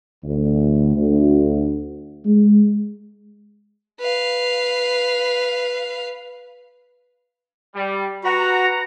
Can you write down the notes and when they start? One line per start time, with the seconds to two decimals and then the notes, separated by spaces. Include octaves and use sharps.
0.23 D2
0.95 D2
2.25 G#3
4.00 B4 F5
7.75 G3
8.24 F#4 B4 F#5 A#5